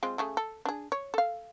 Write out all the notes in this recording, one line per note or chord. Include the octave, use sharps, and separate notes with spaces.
G#3 C4 F4
C#3 A3 G#4
A4
D4 G#4
C#5
A4 F5